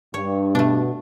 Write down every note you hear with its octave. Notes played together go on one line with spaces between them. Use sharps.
G2 C#5
B2 A3 D4